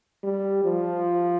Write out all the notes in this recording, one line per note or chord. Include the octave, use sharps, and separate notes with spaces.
G3
F3